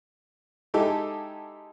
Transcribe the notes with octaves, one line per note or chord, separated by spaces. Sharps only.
G#3 D#4 E4 G4 A4